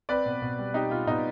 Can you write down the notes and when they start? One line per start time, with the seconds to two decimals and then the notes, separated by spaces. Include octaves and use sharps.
0.09 C4 B4 D5
0.26 B2
0.42 B2
0.59 G3
0.74 C4 D#4 G4
0.91 B2 F4
1.07 B2 D#4